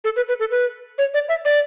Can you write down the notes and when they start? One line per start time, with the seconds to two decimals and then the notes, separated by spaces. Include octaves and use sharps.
0.04 A4
0.16 B4
0.28 B4
0.40 A4
0.51 B4
0.98 C#5
1.14 D5
1.29 E5
1.45 D5